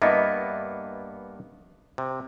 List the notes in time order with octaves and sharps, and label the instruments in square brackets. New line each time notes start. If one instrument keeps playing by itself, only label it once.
[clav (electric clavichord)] G2 A#3 B3 [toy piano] D#5 E5
[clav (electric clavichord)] C3